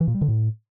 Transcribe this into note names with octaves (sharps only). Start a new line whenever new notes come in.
E3
A#2
G3
D3
A2